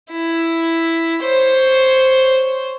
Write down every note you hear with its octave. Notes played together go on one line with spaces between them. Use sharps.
E4
C5 C#5